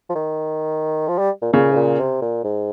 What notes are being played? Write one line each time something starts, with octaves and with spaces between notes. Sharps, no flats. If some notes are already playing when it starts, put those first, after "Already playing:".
F3
D#3
F3
G3
A#2
A#2 C#3
G#2
A#2
C3
A#2
G#2